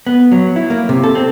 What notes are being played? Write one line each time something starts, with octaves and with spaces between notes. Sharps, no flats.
B3
F#3
E4
A#3
C3
A4
C4